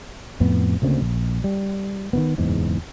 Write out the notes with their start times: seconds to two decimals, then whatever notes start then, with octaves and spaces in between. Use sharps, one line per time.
0.40 F2 A2 B3
0.82 D2 C#3 A#3 C4
1.01 A#1
1.44 G3
2.13 D#3 E3 B3
2.38 F#1 E2 G#2